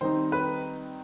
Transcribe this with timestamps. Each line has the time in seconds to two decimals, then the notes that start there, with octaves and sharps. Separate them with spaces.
0.01 D#3 G3 C4 D#4 C5
0.32 B4